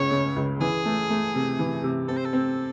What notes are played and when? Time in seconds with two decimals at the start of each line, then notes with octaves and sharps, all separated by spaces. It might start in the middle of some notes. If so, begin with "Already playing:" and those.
Already playing: C#2 C#3 C#4 C#5
0.11 C#3
0.36 C#2
0.60 E3 G#4
0.85 A3
1.10 A3
1.35 C3
1.59 E3
1.84 C3
2.08 C4 A4
2.17 C5
2.25 A4
2.33 C4